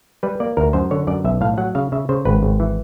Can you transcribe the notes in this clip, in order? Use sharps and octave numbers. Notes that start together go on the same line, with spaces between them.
G3 B4
A#3 D5
D2 A#4
F#2 C5
D3 C#5
F#2 D5
B1 E5
A2 F5
F#3 F#5
C#3 F5
C#3 E5
C#3 C5
G#1 B4
G#1
E3